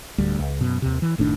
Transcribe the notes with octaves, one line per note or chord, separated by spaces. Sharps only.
D1 D2 G3
C#2
F#2 B2
D#2 C3
E3
F#1 A2 D#3 D4